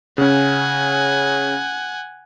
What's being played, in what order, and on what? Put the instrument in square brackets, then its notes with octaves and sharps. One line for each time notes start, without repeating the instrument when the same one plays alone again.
[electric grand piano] C#3 C#4 [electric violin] F#5 G#5